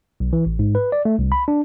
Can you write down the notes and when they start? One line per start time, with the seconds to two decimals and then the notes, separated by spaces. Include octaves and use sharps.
0.20 B1
0.33 E3
0.46 A1
0.59 G#2
0.75 B4
0.92 D5
1.05 A3
1.19 C2
1.32 B5
1.48 D4